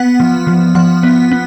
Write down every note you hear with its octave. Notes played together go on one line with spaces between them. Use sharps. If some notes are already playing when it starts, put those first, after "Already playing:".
Already playing: B3 F#5
F3
F3
F3 F#5
B3
B3